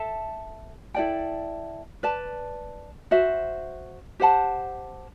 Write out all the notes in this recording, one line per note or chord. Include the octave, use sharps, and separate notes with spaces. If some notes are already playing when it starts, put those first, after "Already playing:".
Already playing: A4 E5 A5
E4 A4 D5 G5
B4 D5 A5
F#4 C5 E5
G4 C5 F#5 A5